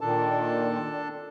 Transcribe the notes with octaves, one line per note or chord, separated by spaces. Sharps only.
A#2 D#3 D4 A4 A5